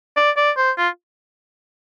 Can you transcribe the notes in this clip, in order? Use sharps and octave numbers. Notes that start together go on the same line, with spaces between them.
D5
D5
C5
F4